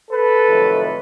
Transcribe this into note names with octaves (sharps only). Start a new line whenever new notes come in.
A4 B4
F2 C3 D#3 F#3 A3